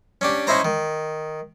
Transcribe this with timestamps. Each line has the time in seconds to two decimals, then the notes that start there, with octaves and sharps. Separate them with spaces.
0.21 C#4 D4 G4
0.47 C#4 D#4 E4 C5 A#5
0.65 D#3